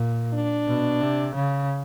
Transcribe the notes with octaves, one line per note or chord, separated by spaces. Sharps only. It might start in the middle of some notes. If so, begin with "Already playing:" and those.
Already playing: A#2
D4
B2
C3
C#3